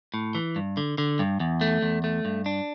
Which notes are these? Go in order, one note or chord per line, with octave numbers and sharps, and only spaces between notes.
A2
E3
G2
D3
D3
G2
E2
A3
E2
A3
G2
D4